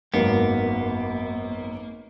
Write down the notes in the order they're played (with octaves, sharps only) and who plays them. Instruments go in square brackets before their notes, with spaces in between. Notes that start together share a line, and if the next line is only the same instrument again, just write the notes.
[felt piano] G#1 F#2 [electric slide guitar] A#3 [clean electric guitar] B3